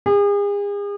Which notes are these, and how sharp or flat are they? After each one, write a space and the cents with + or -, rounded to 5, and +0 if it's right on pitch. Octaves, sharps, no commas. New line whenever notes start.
G#4 -40